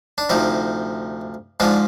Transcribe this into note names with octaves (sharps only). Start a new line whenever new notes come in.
D4
D2 C3 F3 D#4
G#2 F3 G#3 D4